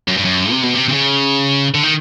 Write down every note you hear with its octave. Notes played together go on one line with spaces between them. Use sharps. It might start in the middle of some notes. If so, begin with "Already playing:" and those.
F#2
G2
F#2
C3
B2
C3
C3
C#3
D3
D#3